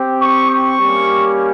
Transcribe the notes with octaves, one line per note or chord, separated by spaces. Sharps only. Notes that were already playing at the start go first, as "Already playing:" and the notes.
Already playing: C4 G4
C#6
C#6
G3 A#3 C#4 G4